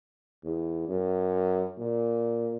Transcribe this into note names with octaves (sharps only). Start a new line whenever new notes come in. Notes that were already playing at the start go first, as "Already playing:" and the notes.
E2
F#2
A#2